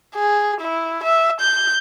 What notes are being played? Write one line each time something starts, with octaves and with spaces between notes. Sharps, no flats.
G#4
E4
E5
G6